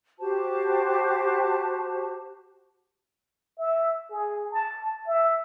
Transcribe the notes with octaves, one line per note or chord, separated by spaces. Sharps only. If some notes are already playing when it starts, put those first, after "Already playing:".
F#4 G4 C5 A5
E5
G#4
A5
E5